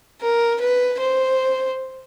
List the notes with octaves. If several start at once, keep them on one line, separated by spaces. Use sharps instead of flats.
A#4
B4
C5